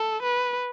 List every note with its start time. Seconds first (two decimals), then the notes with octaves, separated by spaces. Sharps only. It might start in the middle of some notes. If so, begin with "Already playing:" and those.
Already playing: A4
0.23 B4